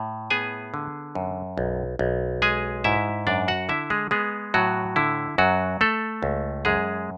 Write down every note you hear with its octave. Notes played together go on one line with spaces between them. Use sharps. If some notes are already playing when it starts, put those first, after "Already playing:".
Already playing: A2
B3 G#4 G#5
D3
F#2
B1
B1
G#3 G#4 G#5
G#2 E4 E5
F#2 D4 D5
F#4 F#5
D3 E4 E5
G#3 G#4
G#3 B3 G#4
A2 F#3 F#4
D3 E4
F#2 F#3 F#4
A3 A4
C#2
F#2 G#3 G#4